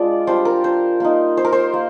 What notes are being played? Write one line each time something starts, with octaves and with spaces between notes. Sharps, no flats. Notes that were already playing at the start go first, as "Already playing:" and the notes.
Already playing: G#3 D4 F4 D5
G3 D4 F4 C5
A#4
C5
A#3 D#4
C5
A#4
C5
A#3